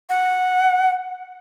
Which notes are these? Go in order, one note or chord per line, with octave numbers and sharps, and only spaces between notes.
F#5